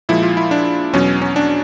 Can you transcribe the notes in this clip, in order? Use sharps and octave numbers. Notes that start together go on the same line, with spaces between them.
A#2 F3 G#3 E4
F4
E4
D4
E2 B2 F#3 C#4
C#4
D4